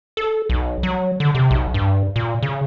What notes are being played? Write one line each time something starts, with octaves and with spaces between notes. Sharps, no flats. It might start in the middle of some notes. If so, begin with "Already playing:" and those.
A4
B1
F#3
D3
C3
B1
G2
A#2
C#3